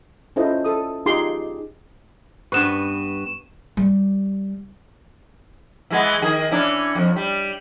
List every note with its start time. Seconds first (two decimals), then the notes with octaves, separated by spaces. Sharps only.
0.36 C#4 E4 F4 A4 C5 D#5
0.65 A4 D#6
1.06 D#4 F4 G4 G#4 C6 D6
2.52 G2 B3 B4 C#6 E7
3.77 G3
5.90 E3 G#3 B3
6.22 D#3 G#4
6.51 E3 C#4 D4
6.95 F2
7.16 G3